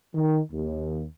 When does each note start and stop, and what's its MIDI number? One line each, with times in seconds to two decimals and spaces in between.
0.14 0.39 51
0.51 1.04 39